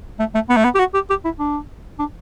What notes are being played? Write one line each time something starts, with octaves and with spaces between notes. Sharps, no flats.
A3
A3
B3
A3
B3
G4
F#4
G4
G4
E4
D4
D4